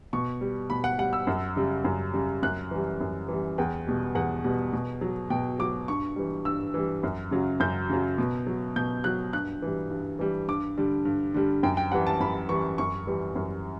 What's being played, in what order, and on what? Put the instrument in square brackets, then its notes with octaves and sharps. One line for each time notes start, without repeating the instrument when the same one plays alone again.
[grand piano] B2 C#6
G3
B2 B5
F#5
G3 F#5
E6
F#2
C#3 G3
F#2
C#3 G3
F#2 F#6
E3 G3
F#2
E3 G3
E2 G5
B2 G3
E2 F#5
B2 G3
B2
F#3
B2 G5
F#3 D6
G2 C#6
E3 G3
G2 E6
E3 G3
F#2
C#3 F#3
F#2 G6
C#3 F#3
B2
F#3
B2 G6
F#3 F#6
G2 F#6
E3 G3
G2
E3 G3
G2 D6
D3 G3
G2
D3 G3
F#2 G5
G5
E3 G3 F#5
A5
F#2 B5
E3 G3 C#6
F#2 C#6
E3 G3
F#2